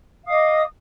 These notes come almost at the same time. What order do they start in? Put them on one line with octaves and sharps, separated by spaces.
F5 D#6 D#5 D6